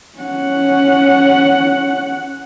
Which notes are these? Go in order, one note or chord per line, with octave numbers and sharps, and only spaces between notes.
C#4 F#5